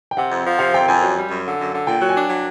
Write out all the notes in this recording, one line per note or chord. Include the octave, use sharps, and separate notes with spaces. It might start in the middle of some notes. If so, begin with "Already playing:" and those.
G5
C3 F#5
F2
F3
C3 F5
F2 G5
F2 G#5
F#2
G3
F#2
D3
F#2
D3
A#2 G5
F#3
G#5
D4
F#3